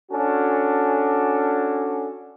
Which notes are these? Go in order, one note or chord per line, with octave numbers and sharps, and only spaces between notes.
C#4 D4 F#4 A4